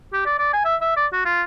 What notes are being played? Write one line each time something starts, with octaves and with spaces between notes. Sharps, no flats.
G4
D5
D5
G#5
E5
E5
D5
F#4
F4